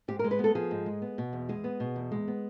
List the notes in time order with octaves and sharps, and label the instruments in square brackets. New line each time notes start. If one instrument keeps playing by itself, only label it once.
[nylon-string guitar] G#2 G4
A#4
G#3
B4
B3 A4
F3 G#4
G#2
G#3
B3
B2
E2
G#3 G#4
B3
B2
E2
G#3
B3